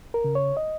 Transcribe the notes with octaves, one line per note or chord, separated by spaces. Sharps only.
A#4
C#3
C#5
D#5